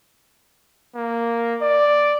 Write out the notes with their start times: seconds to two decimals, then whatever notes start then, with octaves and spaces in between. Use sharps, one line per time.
0.96 A#3
1.62 D5